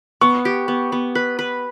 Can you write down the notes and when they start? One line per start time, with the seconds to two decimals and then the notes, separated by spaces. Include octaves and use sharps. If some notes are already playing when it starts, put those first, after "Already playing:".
0.21 B3 C#6
0.45 G4
0.68 B3
0.92 B3
1.15 B4
1.39 B4